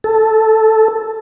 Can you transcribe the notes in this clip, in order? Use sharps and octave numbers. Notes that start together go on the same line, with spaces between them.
A4